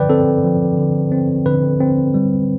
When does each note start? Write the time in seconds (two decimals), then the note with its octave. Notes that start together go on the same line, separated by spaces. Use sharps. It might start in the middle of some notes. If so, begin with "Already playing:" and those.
Already playing: D3 F3 B4 D5 G5
0.09 C4 A4
0.44 F3
0.77 D3
1.12 C4
1.46 D3 B4
1.81 C4
2.14 G3